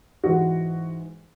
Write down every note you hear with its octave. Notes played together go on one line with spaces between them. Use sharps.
G#2 E3 G#3 F#4